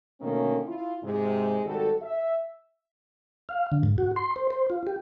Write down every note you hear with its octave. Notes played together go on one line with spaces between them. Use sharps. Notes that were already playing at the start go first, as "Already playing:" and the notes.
B2 D3 D#3 A3 A#3 C#4
E4 F4
G#2 C3 G#3
G#1 G3 F#4 G4 A4
E5
F5
D3
G#2
F#4
C6
C5
C5
F4
G4